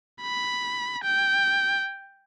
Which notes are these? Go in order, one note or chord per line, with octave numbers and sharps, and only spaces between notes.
B5
G5